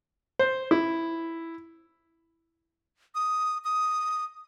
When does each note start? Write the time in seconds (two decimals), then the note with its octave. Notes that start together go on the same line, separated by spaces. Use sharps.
0.39 C5
0.71 E4
3.15 D#6
3.65 D#6